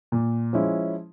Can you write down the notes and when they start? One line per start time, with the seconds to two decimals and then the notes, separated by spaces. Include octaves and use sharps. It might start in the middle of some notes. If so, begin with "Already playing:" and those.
0.12 A#2
0.53 F3 G#3 C#4 E4